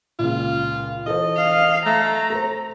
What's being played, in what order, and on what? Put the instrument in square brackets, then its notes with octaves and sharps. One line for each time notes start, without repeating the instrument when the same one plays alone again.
[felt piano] C#2 A#2 [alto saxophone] F4
[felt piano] E3 A4 C5 [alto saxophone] D#5
[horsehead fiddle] F5
[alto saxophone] A3 [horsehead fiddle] A#5
[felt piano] A4 C5